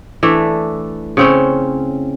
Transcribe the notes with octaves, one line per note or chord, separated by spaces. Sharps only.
E3 A3 D4
C#3 C4 C#4